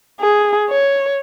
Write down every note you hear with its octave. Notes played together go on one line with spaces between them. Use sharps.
G#4
C#5